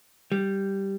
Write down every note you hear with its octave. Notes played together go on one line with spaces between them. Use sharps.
G3